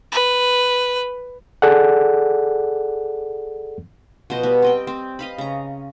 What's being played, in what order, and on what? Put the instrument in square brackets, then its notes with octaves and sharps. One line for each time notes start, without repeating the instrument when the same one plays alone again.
[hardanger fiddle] B4
[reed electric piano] G#4 A4 D5 F#5
[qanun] B2 F3 C5 D#5
G3 B3
C4 D#5 G5
C4
D#5 F5 B5
C#3 A#5